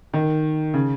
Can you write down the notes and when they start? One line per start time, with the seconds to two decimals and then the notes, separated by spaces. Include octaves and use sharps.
0.14 D#3
0.74 C#3